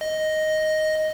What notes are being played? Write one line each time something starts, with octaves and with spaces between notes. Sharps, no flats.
D#5